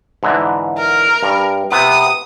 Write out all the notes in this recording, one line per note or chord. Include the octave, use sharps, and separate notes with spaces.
G#2 D3 E3
A#4
G2
C3 B3 D#6